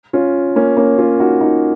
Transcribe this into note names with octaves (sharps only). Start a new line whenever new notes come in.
C#4 F4
A#3 C#4
A#3 C#4
C#4 F4
D#4 F#4
D#4 F#4